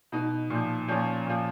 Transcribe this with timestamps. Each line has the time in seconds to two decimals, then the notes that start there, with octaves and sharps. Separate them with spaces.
0.12 B2 D#4
0.50 A#2 F3
0.88 A#2 F3 C#4
1.27 A#2 F3